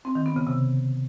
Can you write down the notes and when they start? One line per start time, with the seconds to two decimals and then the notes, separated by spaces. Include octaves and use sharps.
0.05 C4
0.15 D#3
0.26 B3
0.36 C#3
0.47 C3